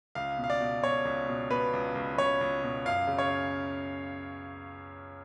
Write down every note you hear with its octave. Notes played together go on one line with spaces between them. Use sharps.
C#2 F5
B2
F5
D5
B2
B2 C#5
C#2
B2
B2 B4
C#2
C#2
C#2 C#5
C#2
B2
F#2 F5
C#3
C#5